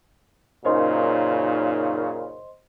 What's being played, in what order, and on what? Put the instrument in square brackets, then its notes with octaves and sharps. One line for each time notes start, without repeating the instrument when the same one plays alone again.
[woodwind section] F#2 C#3 D#4 [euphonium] A#2 [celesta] C5 D#5 C6